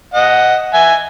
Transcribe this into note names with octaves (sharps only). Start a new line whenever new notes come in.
D#5 F#5
E5 G#5